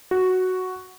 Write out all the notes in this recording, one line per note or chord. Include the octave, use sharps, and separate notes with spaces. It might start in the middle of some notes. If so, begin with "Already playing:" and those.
F#4